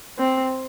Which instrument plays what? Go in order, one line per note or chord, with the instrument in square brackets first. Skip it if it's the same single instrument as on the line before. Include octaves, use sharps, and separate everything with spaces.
[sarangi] C4